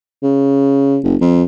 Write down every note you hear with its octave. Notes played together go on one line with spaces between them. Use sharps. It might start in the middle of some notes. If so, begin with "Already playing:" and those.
C#3
F#1
F2